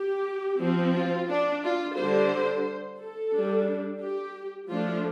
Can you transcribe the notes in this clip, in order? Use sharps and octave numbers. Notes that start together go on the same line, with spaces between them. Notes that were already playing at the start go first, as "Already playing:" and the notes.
Already playing: G4
F3 C4
F4
D4
F4
D3 G3 D4 C5
A4
G3 D4
G4
F3 A3 D4 F4